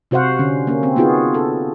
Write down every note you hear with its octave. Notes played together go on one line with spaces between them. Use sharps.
C3 F#4 C5 F5 F#5
D3 C#4
A#3 C#4
C4
B3 D#4 F4 F#4 G#4
A4